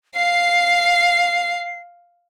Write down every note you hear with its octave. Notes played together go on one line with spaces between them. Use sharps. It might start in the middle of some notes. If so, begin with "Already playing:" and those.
F5 C7